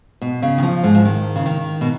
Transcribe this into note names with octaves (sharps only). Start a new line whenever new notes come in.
B2
C#3
D#3
F3
G#2
F3
D#3
C#3
D#3
B2